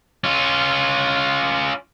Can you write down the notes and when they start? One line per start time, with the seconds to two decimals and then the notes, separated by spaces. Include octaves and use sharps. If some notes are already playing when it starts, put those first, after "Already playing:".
0.24 C#4 F4